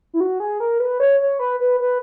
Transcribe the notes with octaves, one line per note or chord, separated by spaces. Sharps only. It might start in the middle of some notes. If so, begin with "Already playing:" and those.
E4
F#4
G#4
A#4
B4
C#5
C#5
B4
B4
B4